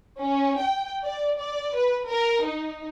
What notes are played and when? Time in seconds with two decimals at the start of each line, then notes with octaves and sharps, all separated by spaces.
0.20 C#4
0.60 G5
1.04 D5
1.40 D5
1.77 B4
2.10 A#4
2.45 D#4